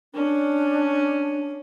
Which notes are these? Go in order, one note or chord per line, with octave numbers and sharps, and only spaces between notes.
C#4 D4